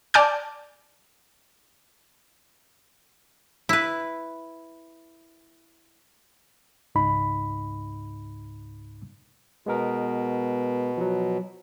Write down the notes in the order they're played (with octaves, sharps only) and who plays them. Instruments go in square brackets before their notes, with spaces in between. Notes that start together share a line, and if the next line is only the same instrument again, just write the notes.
[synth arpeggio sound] D5 G#5 A5 D6 F6 G6
[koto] E4 B4
[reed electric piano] C#2 G#2 D#4 B5
[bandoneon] B2 [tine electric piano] G#3 B3 A#4
[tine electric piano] F3 F#3